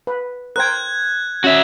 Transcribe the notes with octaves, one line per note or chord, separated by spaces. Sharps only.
B4
A#4 C5 G5 F#6 G#6
C#4 F#4 E5